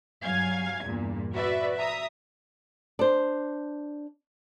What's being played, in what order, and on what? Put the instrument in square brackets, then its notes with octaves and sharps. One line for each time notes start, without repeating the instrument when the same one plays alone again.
[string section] G2 F#3 F5 G#5 G#6
E2 G2 A#2
F#4 B4 D5 E5
E5 A#5 D#6
[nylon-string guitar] D4 C5